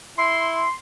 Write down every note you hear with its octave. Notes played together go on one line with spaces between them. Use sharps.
E4 C6